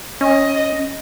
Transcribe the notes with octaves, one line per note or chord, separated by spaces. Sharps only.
C#4 D#5